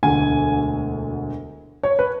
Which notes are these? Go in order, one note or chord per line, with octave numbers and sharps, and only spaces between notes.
E1 D2 D3 G#5
C#5
B4